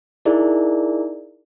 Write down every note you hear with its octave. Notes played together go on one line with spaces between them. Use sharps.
D#4 E4 G#4 A#4 D5